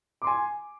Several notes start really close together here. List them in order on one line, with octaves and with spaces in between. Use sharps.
D6 C6 G#5